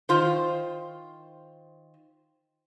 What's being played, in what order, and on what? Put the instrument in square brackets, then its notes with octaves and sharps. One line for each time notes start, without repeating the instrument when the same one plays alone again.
[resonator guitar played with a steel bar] D#3 F4 C5